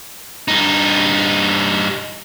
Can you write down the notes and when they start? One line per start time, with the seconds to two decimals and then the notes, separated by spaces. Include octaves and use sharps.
0.48 G2 D#4